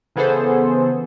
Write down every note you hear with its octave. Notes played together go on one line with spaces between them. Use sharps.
C#3 E3 B3 G#4 A4 C5